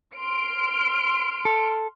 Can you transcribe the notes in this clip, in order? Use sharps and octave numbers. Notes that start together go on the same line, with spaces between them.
C6 F6 D7
A4